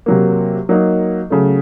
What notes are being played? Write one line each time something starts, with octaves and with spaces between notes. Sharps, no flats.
C3 F#3 A#3
F#3 A#3 D#4
C#3 F#3 A3